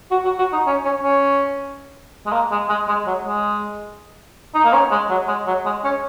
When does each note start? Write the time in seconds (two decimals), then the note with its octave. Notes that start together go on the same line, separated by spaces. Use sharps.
0.11 F#4
0.25 F#4
0.39 F#4
0.53 D#4
0.67 C#4
0.85 C#4
1.03 C#4
2.26 G#3
2.33 A#3
2.51 G#3
2.69 G#3
2.88 G#3
3.07 F#3
3.25 G#3
4.54 D#4
4.64 A#3
4.73 C#4
4.91 G#3
5.10 F#3
5.28 G#3
5.47 F#3
5.65 G#3
5.84 C#4